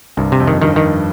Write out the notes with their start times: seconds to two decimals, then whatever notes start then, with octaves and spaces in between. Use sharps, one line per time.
0.17 C2 G2
0.32 C3
0.40 F2
0.47 D#3
0.62 G2 D#3
0.76 D#3